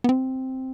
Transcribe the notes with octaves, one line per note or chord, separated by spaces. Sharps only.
B3
C4